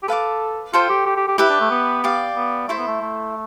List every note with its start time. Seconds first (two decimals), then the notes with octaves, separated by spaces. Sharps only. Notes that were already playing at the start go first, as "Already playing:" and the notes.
0.03 G4
0.08 A4 B4 F5 A5 D6
0.73 F4 A4 C5 G5
0.90 G4
1.06 G4
1.17 G4
1.28 G4
1.38 E4 G4 B4 E5
1.50 D4
1.60 A3
1.71 B3
2.04 G4 D5 F5
2.36 B3
2.68 A3 E4 A4 C5 E5
2.78 B3
2.87 A3
3.02 A3